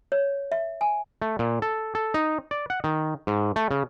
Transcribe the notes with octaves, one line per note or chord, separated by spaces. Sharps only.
C#5
E5
G#5
A3
A#2
A4
A4
D#4
D5
F#5
D#3
G#2
A3
C#3